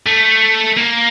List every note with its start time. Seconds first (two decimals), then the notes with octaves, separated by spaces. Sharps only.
0.06 A3
0.77 A#3